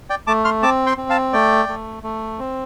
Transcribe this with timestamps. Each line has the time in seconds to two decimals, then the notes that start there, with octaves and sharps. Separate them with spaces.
0.10 D5 G5
0.27 A3 A5 D6
0.45 C6 F6
0.62 C4 A5 D6
0.86 G5 C6
0.97 C4
1.09 F5 A5
1.33 A3 D5 G5
1.69 A3
2.03 A3
2.39 C4